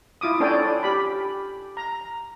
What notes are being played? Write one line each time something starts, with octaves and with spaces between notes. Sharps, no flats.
E4 F4 D6 D#6
C#4 D4 A4 C#5 D5 G5
G4 B5
A#5